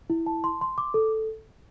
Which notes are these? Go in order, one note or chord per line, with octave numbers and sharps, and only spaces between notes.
E4
A5
C6
C6
D6
A4